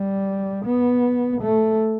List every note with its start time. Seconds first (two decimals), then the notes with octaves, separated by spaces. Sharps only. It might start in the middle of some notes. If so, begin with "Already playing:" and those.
Already playing: G3
0.65 B3
1.41 A3